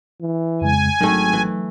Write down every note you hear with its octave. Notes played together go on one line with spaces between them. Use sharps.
E3
F2 C#3 G#3 G#5
G#1 D#3 F#3 A3
E3